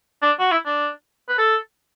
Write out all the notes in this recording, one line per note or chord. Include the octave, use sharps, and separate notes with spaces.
D4
F#4
E4
D4
B4
A4